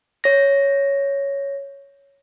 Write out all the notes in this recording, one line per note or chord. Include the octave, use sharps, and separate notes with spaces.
C#5 A#6